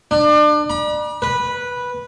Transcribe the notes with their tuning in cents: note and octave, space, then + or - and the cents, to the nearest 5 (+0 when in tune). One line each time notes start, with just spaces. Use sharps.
D4 +30
B5 -45
B4 -10